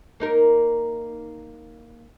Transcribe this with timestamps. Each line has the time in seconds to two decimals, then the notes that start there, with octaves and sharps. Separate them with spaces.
0.20 A#3 D#4 A#4